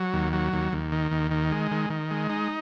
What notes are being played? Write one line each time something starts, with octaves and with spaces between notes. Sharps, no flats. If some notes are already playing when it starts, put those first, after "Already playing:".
Already playing: F#3
D#2
F#3
D#2
D#2
D#3
D#2
D#3
G#3
D#3
D#3
G#3
D#4